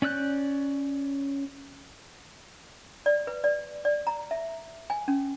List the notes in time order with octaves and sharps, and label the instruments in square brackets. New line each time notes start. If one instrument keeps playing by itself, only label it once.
[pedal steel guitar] C#4 D5 E6 F#6 G6
[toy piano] D5
B4
D5
D5
A#5
E5
G#5
C#4